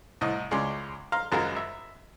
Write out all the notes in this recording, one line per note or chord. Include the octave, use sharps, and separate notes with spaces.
C2 A2 D#5
C#2 G#3 C#4 D5 C6
F5 A#5 C6
G#1 F#2 G#3 F4 F#4 A#4
E5